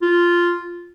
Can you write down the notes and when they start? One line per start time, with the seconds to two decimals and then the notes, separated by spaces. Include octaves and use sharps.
0.02 F4